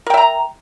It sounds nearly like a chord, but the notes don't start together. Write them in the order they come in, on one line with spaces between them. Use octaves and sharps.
A#4 G5 E5 A#5